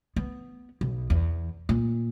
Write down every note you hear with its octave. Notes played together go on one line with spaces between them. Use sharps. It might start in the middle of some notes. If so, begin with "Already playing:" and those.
B3
B1
E2
A#2